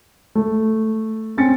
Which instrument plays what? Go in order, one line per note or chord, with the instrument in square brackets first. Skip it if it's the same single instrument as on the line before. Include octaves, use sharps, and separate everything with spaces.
[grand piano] A3
[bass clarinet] C4 [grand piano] C#4 A6 C#7